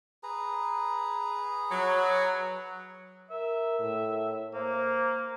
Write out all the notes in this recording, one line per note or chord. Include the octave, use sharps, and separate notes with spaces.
G#4 B4 A#5
F#3
A#4 E5
A2
A#3 C5